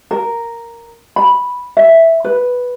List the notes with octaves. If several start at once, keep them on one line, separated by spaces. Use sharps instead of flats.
A#4
B5
E5
B4